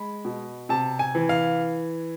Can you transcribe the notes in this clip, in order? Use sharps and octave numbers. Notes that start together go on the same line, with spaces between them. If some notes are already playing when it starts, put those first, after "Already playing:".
Already playing: G#3 B5
B2
C3 A5
G#5
E3
F5